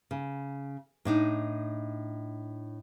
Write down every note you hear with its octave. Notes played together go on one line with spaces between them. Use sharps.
C#3
A2 D4 D#4